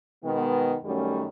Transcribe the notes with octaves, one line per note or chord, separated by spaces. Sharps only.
B2 D#3 G#3 B3
F#2 D#3 F#3 G3 A3 C#4